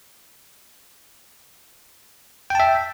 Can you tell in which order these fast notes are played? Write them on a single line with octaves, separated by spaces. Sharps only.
G5 A5 E5